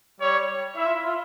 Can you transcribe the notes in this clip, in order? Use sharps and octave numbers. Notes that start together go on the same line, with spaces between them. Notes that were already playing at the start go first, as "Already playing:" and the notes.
G3 C#5
E4 E5
F4
E4
F4